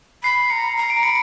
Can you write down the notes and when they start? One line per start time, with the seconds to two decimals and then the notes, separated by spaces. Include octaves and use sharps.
0.23 B5 C7
0.50 A#5 C#7
0.77 A#5
0.90 D7
1.03 B5 C#7